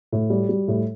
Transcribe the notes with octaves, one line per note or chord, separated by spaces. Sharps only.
A2
G3
G3
A2